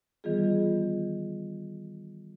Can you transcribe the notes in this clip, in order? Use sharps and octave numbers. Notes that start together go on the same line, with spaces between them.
D#3 E3 G3 B3 F4 G#4